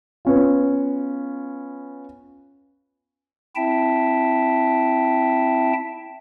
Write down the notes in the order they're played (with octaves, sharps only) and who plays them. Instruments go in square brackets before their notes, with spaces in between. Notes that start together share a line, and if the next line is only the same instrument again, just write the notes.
[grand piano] B3 C#4 F4
[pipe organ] C4 E4 E5 G5 A5